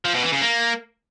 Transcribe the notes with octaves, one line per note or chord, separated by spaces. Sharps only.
F3
B2
E3
C#3
A#3